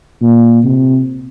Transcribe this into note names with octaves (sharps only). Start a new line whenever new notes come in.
A#2
C3